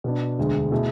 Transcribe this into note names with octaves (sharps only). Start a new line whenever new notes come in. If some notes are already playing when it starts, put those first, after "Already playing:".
B2 B3 D4
E1 D2 D3 G#3
B2 A3 E4 G#4